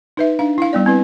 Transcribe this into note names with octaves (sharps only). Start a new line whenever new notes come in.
D#4 B4 E5
D4 F5
E4 F5
G3 B3 D5
C4 E4 B4